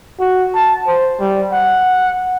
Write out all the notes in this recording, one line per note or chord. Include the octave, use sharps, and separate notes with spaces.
F#4
A5
C5
G3
F#5